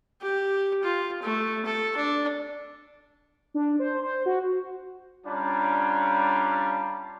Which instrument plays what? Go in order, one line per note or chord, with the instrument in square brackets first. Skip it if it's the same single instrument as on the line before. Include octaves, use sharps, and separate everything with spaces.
[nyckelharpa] G4
F4
A3
A4
D4
[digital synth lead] D4
C5
C5
F#4
[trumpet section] G3 C#4 D4 F4 D5 A#5